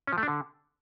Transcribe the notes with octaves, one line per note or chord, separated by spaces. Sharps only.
C#4
F3
A3
D4
D3